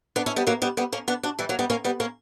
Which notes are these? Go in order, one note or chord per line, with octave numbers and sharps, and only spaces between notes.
B3 D4
C#4 E4
G3 B3
F#3 A#3
G3 B3
G3 B3
A#3 C#4
B3 D4
D4 F#4
E3 G3
F#3 A#3
G3 B3
A#3 C#4
G3 B3
A#3 C#4